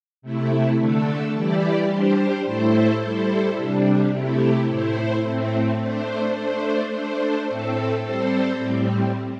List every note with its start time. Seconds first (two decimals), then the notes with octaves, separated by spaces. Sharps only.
0.22 C3 A3 E4
0.78 D3 A3 D4 A4
1.34 E3 G3 E4 G4 D5
1.89 G3 D4 G4 C5
2.45 A2 A3 E4 A4 C5
3.01 G3 E4 A4 C5
3.56 C3 G3 D4
4.12 C3 A3 E4 G4
4.68 A2 A3 E4 C5
5.24 A2 A3 C4
5.80 A3 D4 C5
6.35 A3 D4 C5
6.91 A3 D4 C5
7.47 A2 A3 C4 A4
8.03 G3 C4 A4 C5
8.58 A2 G3 C4